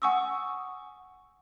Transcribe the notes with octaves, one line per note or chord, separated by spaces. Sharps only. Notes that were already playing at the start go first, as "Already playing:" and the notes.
F#5 G#5 C#6 D#6 E6